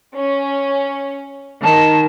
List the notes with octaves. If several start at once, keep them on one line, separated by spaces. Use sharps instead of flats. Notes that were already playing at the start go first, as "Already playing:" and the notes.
C#4
D#3 A5